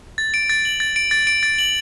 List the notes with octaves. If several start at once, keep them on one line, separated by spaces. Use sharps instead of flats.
A6
D7
A6
F#7
A6
D7
A6
D7
A6
F#7